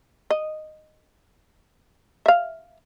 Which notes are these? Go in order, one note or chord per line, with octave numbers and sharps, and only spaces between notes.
D#5
E5 F5